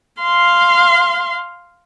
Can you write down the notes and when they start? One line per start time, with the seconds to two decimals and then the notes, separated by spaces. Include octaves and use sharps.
0.21 F5 C6